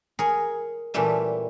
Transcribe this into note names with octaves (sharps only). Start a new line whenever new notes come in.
G#4 A#4 C#5 G#5
A#2 E3 G3 A3 C#4